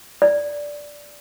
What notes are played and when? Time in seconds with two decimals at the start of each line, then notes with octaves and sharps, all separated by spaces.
0.22 D5